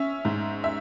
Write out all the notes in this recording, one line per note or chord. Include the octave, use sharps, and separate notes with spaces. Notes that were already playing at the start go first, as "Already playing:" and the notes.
Already playing: C#4 E5
G#2
E5